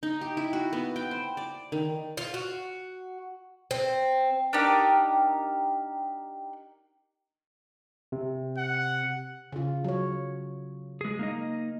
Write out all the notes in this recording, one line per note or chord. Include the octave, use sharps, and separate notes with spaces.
D#4
G4
E4
F#4
B3
G5
C5
D5
D#3
F4
F#4
C4
D4 D#4 G4 A#4
C3
F#5
C#3 F4
F#3 C#5
G#3 G#4
A#3 D#4 D#5